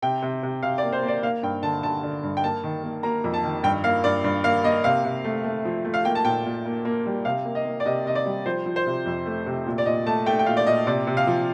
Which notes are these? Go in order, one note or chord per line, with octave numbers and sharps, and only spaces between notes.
C3 G5
C3
C3
C3 F5
D5
A#3
C5
A#3
D5
A#3 F5
G2 G5
D3 A5
D3 A5
D3
G2
G5
A#3 A5
D#3
A#3
A#3 A#5
F2
A5
D#3
G2 G5
A#3 F5
G2 D5
G2
A#3 F5
A#3 D#5
C3 F5
C3
A3
A3
F3
A3
F5
A#3 G5
A5
A#2 G5
A#2
A#3
A#3
G3
C3 F5
A#3
D#5
A#3
D5
C3 D#5
C3 D#5
D5
G3
F3 C5
F3
C5
C3
F2
A3
C3
A#2
D5
A#2 D#5
A3 A5
A3 G5
G5
A#2 F5
D5
A#2 D#5
C3 D5
C3
F5
F3